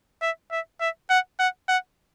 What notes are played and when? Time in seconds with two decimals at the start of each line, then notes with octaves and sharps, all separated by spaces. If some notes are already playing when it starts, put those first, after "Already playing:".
0.22 E5
0.51 E5
0.80 E5
1.10 F#5
1.39 F#5
1.68 F#5